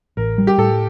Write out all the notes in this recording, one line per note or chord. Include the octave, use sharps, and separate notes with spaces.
A1 A#4
G3
G4
A2 A4